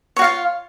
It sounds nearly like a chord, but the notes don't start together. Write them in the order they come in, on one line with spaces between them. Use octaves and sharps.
C#5 F#4 F5 F4